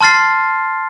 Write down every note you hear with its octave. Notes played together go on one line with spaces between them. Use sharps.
A5 C6 F6 A6 C7